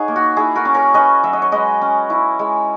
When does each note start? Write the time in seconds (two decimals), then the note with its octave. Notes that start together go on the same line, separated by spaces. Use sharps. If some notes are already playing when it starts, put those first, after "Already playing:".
Already playing: D#4 G#4 C#5 F#5
0.08 A#3
0.16 F#4
0.37 E4 G#4
0.55 F#4 A#4
0.65 C#4
0.74 A#4 C#5
0.94 C#4 B4 D#5
1.24 F#3 E5
1.33 D#5
1.42 C#5
1.52 G#3 B4 D#5
1.82 C#4
2.10 E4
2.39 G#3